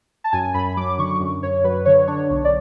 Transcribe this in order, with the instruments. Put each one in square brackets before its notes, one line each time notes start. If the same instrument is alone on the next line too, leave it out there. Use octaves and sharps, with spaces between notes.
[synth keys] A5
F#2 G#5
F#2 B5
F#3 D6
D3 C#6
F#2
F#2 C#5
F#3 B4
D3 C#5
D4 C#5
B1
D5